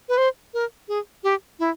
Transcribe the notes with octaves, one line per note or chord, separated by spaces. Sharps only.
B4
C5
A#4
G#4
G4
E4